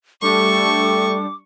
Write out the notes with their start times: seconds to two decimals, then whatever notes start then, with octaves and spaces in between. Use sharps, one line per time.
0.22 G3 A3 D4 G4 A4 C#6 D6